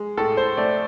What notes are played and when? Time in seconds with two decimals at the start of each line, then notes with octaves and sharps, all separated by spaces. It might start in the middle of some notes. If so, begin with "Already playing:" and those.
Already playing: G#3
0.17 A2 A4
0.37 C5
0.57 A3 D5